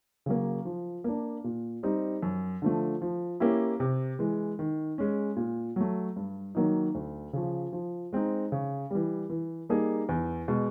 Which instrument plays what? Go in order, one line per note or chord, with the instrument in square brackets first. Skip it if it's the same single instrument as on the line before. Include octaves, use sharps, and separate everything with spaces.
[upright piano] C#3 F#3 A#3
F3
A#3 D4
A#2
G3 C4 D#4
F#2
D3 F3 A3
F3
A#3 C#4 E4 G4
C3
E3 G#3
D#3
G#3 C#4
A#2
F#3 A3
G2
D#3 F#3 A#3 D#4
D2
C#3 F3
F3
G#3 C4 D#4
C#3
E3 G3
E3
G3 A#3 D#4 G#4
E2
B2 G#3